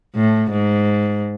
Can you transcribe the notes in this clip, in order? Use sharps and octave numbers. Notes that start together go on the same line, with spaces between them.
A2
G#2